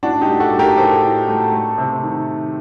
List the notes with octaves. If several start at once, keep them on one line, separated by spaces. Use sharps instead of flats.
A2 D4 F#4
F#4
D#4 G4
A3
F#4 A4
A3
G4 A#4
A2 A4 C5
A2
A3
A3
C3
D#3